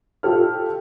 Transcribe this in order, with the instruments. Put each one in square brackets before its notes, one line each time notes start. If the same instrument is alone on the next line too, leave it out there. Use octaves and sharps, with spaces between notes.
[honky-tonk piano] F4 G4 A4 F6